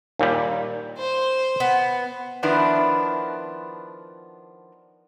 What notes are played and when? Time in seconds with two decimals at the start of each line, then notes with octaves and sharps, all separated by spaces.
0.19 D#2 A#2 G3
0.98 C5
1.60 B3
2.43 D#3 F3 B3 D4 E4